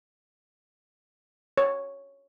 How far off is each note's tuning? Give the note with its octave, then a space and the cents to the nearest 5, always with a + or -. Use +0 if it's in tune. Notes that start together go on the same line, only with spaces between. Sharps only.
C#5 +0